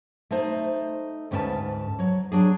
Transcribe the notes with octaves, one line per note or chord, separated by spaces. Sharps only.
A3 D#4 C5 D#5
D2 G#2 C#4 B4 G5 A5
F#3 C#5
F#3 D4 G#4